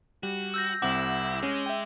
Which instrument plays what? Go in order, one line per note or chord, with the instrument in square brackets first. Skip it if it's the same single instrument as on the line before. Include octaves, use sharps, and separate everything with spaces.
[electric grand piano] G3 [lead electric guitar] F#4
[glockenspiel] E6 G6 A#6
[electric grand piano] C2 C4 F#5 [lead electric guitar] E4 [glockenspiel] D6
[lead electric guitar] G#3 [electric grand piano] C#4
[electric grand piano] E5 G5